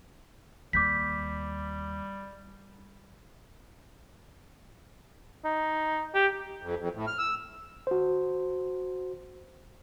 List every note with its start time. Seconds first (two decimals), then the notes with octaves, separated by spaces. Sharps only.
0.73 D#2 G3 D6 G6 B6
5.45 D#4
6.14 G4
6.62 F2
6.79 F2
6.95 A2
7.07 F6
7.18 E6
7.87 F#4 C5